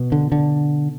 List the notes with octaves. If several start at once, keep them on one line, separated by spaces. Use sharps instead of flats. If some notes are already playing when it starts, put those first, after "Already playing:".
Already playing: B2
D3
D3